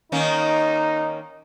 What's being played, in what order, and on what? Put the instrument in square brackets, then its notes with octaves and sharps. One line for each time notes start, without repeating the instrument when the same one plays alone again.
[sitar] D#3 A#3 C#4 [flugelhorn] D#4